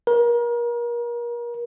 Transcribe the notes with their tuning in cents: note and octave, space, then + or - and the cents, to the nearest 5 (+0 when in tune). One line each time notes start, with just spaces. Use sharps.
A#4 +35